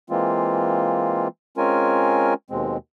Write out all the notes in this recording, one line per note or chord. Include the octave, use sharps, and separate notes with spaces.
E3 G#3 A#3 C4 F4
G#3 C4 C#4 F4 A#4 G#5
D#2 B2 G#3 C4